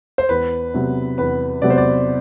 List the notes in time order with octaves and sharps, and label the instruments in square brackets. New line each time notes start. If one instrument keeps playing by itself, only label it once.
[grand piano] C5
[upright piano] E2 [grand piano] B4
[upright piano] C3 F#3 B3
[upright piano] E2 [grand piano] B4
[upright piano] C3 F#3 B3 [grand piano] D5
[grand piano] C5
D5